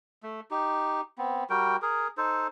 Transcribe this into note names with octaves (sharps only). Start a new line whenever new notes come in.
A3
D#4 G4
B3 C4
G3 F#4 A#4 G5
G#4 A#4
D#4 A4 C5